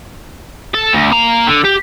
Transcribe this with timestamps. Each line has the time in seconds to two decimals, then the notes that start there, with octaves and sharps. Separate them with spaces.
0.74 A4
0.93 D2
1.12 A#3 A#5
1.47 D3
1.65 G4